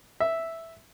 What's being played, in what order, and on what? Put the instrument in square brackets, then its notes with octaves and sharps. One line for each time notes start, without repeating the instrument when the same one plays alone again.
[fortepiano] E5